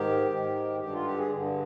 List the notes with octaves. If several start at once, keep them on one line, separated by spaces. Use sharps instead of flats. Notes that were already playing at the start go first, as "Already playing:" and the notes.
Already playing: G#2 D#3 G4
G#2 D#3
G2 D3 G4
F4
G4
G#4
G2 D3